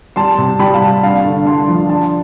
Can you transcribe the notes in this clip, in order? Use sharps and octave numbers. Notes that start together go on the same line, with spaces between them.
G3 A5 C6
C3
G3 G5 B5
F5 A5
C3
G2 F5 A5
D3
G2 A5 C6
F3
D4 A5 C6